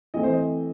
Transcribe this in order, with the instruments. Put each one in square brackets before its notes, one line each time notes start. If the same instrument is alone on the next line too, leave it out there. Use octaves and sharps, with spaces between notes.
[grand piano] E3 A3 C4 D#5
C5
D#5